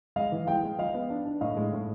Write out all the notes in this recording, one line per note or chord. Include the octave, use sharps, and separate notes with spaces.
G#3 D#5 F5
E3
G#3 F5 G5
G#3
F3 D#5 F5
B3
D4
D4
A2 D#5 F5
G#3
A2